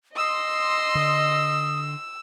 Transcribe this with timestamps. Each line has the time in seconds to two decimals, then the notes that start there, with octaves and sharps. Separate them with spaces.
0.16 D#5 C6 D#6 E6
0.95 D3 D#6